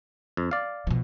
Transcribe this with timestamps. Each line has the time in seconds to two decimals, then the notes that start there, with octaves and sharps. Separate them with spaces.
0.37 F2
0.51 D5 F5
0.87 B2 F3